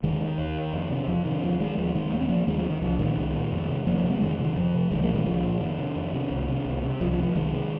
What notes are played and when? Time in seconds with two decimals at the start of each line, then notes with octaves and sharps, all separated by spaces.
0.03 D#2 D#3 G#3
0.21 D#3
0.38 D#2
0.73 F2
0.90 C3
1.08 F2 F3
1.25 C3 D#3
1.43 D#2 F3
1.60 D#3 G#3
1.78 D#2 F3
1.95 D#3 G#3
2.12 D#2 A#3
2.21 C4
2.29 F3 A#3
2.47 D#2 D#3 G#3
2.59 F3
2.70 D#3
2.81 C2 F3
2.99 A#2 D#3 G#3
3.17 C2
3.35 A#2
3.52 F2
3.69 C3
3.86 F2 F3 A#3
3.98 F3 A#3
4.04 C3
4.10 G#3 C4
4.21 F2 D#3 G#3
4.39 C3
4.45 D#3
4.56 F2 F3
4.74 C3
4.91 C2 D#3 G#3
5.02 F3 A#3
5.09 A#2
5.14 D#3 G#3
5.26 C2 F3
5.43 A#2
5.61 F2 D#3
5.78 C3
5.96 F2
6.13 C3
6.30 C2
6.48 C3
6.65 C2
6.83 C3
7.00 C2 F3
7.11 F3
7.18 C3
7.23 F3
7.35 C2 D#3 G#3
7.52 C3